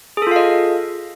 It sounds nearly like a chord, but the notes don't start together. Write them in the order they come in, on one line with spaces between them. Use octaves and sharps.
G#4 A4 F4 F5 D#5